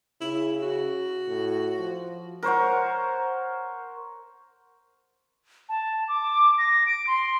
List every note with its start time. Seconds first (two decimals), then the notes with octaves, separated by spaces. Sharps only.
0.21 C#3 E4
0.62 F#4
1.27 A2
1.79 F3
2.43 A#4 C5 C#5 F#5
5.69 A5
6.08 D6
6.58 A#6
6.86 D7
7.07 C6